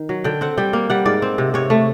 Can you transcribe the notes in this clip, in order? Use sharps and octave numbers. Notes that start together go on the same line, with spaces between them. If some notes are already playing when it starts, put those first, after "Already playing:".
Already playing: D#3
F#3
D3 G5
C4 F#5
G3 G5
A#3
G3 F#5
G#2 D5
C4
C3
C3 C#5
A3